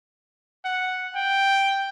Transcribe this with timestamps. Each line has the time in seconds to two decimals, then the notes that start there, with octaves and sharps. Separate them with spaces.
0.65 F#5
1.15 G5